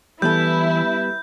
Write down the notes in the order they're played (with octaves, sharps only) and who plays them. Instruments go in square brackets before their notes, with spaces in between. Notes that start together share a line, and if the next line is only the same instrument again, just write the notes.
[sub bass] E3 [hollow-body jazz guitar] G3 B3 A4 [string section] E4 [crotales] G6